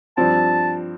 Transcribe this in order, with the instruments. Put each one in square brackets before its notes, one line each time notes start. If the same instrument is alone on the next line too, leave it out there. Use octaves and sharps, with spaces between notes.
[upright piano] G2 F3 C4 [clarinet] A5